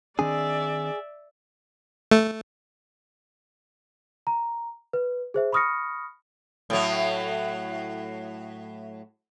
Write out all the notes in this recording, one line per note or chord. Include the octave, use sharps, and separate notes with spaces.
D#3 C4 D4 G#4 D5 E5
A3
A#5
B4
G#4 C5 E5
B5 C#6 D#6 F6 A#6 C#7
A2 F#3